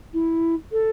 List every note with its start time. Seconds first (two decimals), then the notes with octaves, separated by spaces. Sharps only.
0.13 E4
0.72 A4